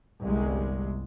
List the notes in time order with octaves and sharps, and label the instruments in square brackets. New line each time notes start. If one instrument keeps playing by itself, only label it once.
[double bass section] G1 C2 G#3